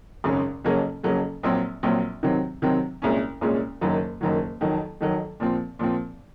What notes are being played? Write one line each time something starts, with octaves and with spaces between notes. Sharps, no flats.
G#1 F#2 C#3 G#3 C#4
F2 C#3 F#3 A#3 C#4
F2 C#3 F#3 A#3 C#4
A#1 A#2 F#3 C4
A#1 A#2 F#3 C4
C3 D#3 F#3 C4
C3 D#3 F#3 C4
C2 A#2 G#3 C#4
C2 A#2 G#3 C#4
F#1 F#2 D#3 F#3
F#1 F#2 D#3 F#3
F2 D#3 F#3
F2 D#3 F#3
A#2 F3 C4
A#2 F3 C4